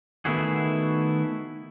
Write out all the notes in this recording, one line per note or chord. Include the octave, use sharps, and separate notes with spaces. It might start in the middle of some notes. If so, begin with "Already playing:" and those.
D#3 A3 B3 E4 F#4 G#4